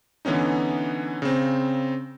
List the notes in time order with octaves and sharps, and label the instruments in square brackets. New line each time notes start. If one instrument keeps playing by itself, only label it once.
[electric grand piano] D3 E3 B3 C#4 D#4
C#3 C4